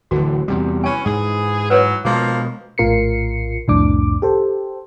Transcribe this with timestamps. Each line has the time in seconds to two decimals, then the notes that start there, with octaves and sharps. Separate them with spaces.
0.11 D1 D3 E3 F#4
0.48 E2 C3 G3
0.84 E3 C#4 G#5
1.06 G#2 E3 G#4
1.70 E3 F#3 B4 C#5
2.05 B2 F3 G#3 A#3
2.78 A#1 A2 F4 A#4 C7 C#7
3.68 C2 F2 A2 D4 D6
4.22 G4 A4 C5